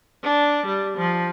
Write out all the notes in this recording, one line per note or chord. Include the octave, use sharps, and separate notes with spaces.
D4
G3
F3